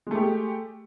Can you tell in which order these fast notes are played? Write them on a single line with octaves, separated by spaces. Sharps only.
G#3 A3 G4